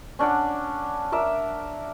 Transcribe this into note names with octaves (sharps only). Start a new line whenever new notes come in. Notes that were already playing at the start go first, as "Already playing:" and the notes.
C#4 D4 D5 F#5
A#4 D5 E5